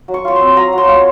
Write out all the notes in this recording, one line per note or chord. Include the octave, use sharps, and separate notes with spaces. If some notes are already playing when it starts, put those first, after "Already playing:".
F#3
C#6
F4 C#6
C4 C6
F#3 A#5
F#3 C6
F4